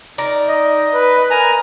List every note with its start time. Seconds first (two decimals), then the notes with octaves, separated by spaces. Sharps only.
0.18 D#4 A#4 D5
0.48 D#5
0.93 B4
1.30 A#4 G#5 A#5